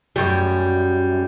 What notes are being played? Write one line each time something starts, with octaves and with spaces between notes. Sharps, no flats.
F#2 G3